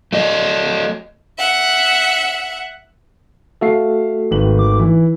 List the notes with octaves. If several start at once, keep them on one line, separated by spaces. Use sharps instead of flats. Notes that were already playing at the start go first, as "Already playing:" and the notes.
A3 F#4 D#5
E5 F#5
A3 F#4 A4 E5 F5 C7
G#1 D#3 B4 F#7
D6
E3 E4